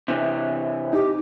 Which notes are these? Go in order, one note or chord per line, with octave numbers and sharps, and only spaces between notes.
C3 E3
D#4 G4